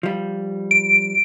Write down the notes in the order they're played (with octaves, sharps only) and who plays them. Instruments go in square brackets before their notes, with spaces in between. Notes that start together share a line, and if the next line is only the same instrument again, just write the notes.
[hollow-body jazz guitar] F3 G3
[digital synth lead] D7